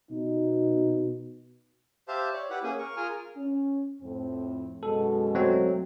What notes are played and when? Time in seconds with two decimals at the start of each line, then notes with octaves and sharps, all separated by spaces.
0.11 B2 D#4
2.08 G4 C5 E5 F5 A5
2.33 C#5 D5
2.50 E4 G4 B4 F#5
2.64 A#3 C#4 G#4 G#5
2.79 A#4 C#6
2.97 F4 G#4 A#4 G#5 F6
3.37 C#4
4.02 F2 A2 C4
4.83 F#2 B2 G#3 A4
5.35 F#3 A3 C4